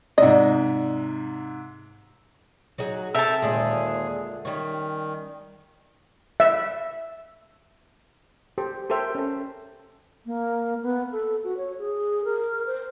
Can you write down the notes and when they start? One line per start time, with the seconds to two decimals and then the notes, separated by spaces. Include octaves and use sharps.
0.18 G#2 C3 D5 D#5
2.78 F#3 D#4 G#4
3.14 C3 A4 E5 G5 A5 A#5
3.42 D#2 A#2 D3 G#3 G#4
4.45 D#3 G3 C#4
6.40 E5
8.58 G4 A4 C5
8.89 G4 A4 A#4 C5 E5 G5
9.15 C#4 A4
10.26 A#3
10.83 B3
11.12 A4
11.44 F#4
11.57 C#5
11.79 G#4
12.24 A#4
12.66 C5